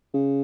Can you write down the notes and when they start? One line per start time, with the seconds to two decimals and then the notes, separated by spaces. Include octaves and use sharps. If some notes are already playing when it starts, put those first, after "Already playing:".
0.14 C#3